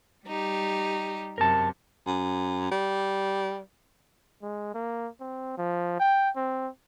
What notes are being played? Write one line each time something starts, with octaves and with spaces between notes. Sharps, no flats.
G3 D#4 G4
F#2 C3 A#4 A5
F#2
G3
G#3
A#3
C4
F3
G5
C4